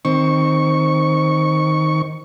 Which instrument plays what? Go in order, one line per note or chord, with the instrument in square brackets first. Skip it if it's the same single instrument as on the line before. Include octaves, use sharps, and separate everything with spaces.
[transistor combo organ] D#3 C#6 [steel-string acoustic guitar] C4